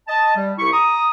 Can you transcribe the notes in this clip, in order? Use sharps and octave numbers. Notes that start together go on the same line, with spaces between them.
D#5 A5
G3
C2 E4 G4 C#6
A#5 D#6